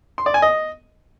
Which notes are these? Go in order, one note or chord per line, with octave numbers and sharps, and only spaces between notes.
C6
D5
G#5
D#5